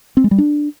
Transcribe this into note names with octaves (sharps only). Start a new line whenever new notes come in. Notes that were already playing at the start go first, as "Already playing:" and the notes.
C4
G#3
G3
D4